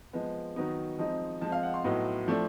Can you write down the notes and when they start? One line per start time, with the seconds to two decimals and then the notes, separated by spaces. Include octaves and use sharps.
0.13 F3 G#3 B3
0.56 D#3 F#3 B3 D#4
0.99 F3 G#3 C4 D#4
1.41 F3 G#3 C4 A5
1.52 F5
1.63 F#5
1.74 C6
1.84 A2 F#3 B3 D#4
2.27 A2 F3 A3 D4